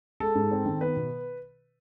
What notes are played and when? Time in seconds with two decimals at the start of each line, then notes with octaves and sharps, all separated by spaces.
0.20 G#3 A4
0.35 G#2
0.51 C4
0.66 D#3
0.81 B3 B4
0.96 B2